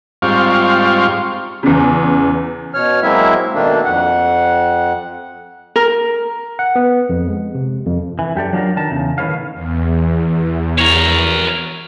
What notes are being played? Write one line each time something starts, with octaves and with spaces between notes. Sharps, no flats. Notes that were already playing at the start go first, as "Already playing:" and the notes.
G#2 G3 C4 F4 F5 C#6
E2 C#3
B2 C#5 F6
F#3 G#3 A#3 C4 E4 E5
B2 D#3 A3 A#3 D4
F2 F#5
A#4
F#5
B3
F2
G#3
C3
F2
E3
F#2 G4 A4 D5
F#3 D4 F4 A#4
D#3 A#4 A5
E2 C#3
A2 D#3 B4 C#5 F5
E2
A#4 C#5